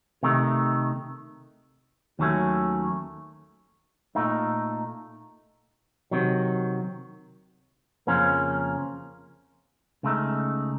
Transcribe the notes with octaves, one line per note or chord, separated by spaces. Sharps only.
C3 D#3 A3 D#4
D#2 D#3 F#3 A3 C#4
A#2 A3 D#4
C3 D#3 F#3
F2 C#3 F3 A#3 C#4
C#2 C#3 A3 D#4